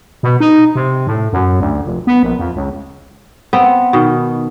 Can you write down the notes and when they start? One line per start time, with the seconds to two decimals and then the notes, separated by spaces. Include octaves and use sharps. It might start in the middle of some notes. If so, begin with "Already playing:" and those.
0.23 B2
0.40 D#4
0.75 C3
1.07 A2
1.33 F#2
1.60 D2
1.85 F1
2.07 B3
2.23 A#1
2.39 F2
2.56 C#2
3.53 B3 C4
3.93 B2 D#3